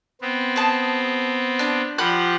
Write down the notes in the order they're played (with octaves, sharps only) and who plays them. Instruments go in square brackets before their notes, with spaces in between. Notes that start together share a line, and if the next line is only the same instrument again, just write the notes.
[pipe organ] B3 C4
[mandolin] G#4 A5
D4
[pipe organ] F3 G4 F#5 [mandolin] B5 F#6